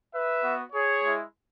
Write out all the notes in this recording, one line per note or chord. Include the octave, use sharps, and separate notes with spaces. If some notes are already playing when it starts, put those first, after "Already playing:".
B4 E5
B3 F#4
G#4 C#5
G#3 E4